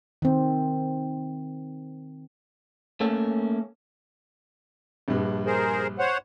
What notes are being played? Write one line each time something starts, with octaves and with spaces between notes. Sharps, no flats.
D#3 C4
A3 A#3 C#4 A4
A#1 G2
G#4 A#4 C5
C5 C#5 F#5